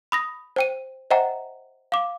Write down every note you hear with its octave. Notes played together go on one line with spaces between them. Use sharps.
B5 D#6 A#6
C5 G5 D#7
C5 D#5 E5 F#5 G5 A#5
F5 D6